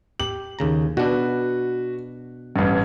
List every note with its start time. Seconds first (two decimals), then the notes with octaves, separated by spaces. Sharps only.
0.20 G4 F#7
0.59 D#2 C#3 A#5
0.97 B2 D4 F#4 B4
2.56 A1 G2